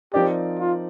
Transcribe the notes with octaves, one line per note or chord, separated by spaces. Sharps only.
F3 C4 D#4 G4 A#4 D5
F4